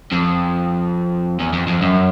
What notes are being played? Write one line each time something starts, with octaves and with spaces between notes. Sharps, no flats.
F2
E2
F2
F2
F#2